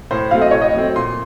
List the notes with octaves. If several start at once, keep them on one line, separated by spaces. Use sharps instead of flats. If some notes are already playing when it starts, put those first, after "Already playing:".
A2 C5
F#3 A3 C4 F5
D#5
A2 C#5
D#5
F#3 A3 C4
A#2 C6